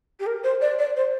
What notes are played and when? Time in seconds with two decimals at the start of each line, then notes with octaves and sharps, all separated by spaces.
0.19 G4
0.26 A#4
0.43 C5
0.61 D5
0.78 D5
0.96 C5